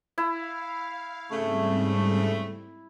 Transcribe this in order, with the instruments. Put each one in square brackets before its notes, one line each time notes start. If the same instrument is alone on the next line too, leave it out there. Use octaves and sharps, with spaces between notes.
[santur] E4 [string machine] F5
[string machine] G#2 G3 C4 [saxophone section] C#3 A3